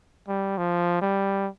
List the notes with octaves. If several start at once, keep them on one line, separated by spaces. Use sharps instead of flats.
G3
F3
G3